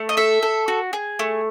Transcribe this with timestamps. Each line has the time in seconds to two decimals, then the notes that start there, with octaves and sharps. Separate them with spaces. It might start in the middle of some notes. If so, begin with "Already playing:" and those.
Already playing: A3
0.09 D#5
0.17 A4 E5
0.43 A4
0.68 F#4
0.93 G#4
1.19 A3